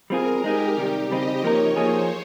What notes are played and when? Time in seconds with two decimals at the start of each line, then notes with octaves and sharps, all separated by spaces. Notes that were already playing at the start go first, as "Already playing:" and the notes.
0.10 G3 C4 F4 G#4 A#4
0.44 G#3 D#4 G4 G#4
0.77 C3 D#3 G3
1.10 C#3 G3 C4 D#4 D#5
1.44 F3 A#3 D#4 A#4 C#5
1.76 F3 A#3 D#4 G#4 C5